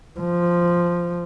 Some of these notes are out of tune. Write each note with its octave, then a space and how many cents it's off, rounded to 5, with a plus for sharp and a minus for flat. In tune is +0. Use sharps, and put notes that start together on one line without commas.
F3 -5